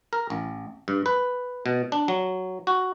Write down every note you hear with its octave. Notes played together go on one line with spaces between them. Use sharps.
A#4
A1
G2
B4
B2
D4
F#3
F#4